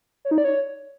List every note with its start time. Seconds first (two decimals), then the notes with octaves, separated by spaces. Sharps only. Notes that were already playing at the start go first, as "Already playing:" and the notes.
0.25 C#5
0.31 D#4
0.38 D5
0.44 C#5